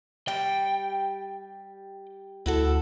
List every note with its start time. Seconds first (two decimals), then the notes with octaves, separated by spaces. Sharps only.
0.28 G3 G5
2.46 D2 E4 F#4 A4